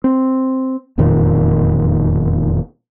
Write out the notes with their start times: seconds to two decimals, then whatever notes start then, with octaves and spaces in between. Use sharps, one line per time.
0.04 C4
0.98 E1 F2 A#2 D#3